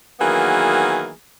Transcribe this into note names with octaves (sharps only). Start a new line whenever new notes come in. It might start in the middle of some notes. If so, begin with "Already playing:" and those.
D#3 E3 F#3 A#3 B3 G#4